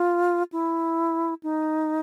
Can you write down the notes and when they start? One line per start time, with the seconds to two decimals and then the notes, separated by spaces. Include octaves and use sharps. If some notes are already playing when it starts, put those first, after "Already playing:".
Already playing: F4
0.52 E4
1.43 D#4